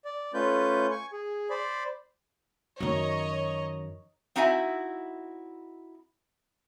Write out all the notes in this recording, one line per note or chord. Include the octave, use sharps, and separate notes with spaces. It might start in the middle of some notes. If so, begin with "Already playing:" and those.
D5
A3 C#4 F4 B4 G6
G#5 C#6
G#4
C5 D5 B5
F#2 D#3 C#5 D#5 A#5
C4 D#4 E4 F#4 E5 G#5